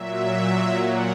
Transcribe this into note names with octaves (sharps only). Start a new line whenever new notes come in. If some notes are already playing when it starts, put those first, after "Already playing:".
Already playing: A#2 F#3 E5
F#5